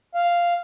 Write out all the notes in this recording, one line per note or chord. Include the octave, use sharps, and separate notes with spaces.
F5